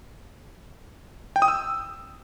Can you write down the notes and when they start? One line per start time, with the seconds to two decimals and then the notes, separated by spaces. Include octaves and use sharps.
1.36 G5
1.42 D#6
1.48 E6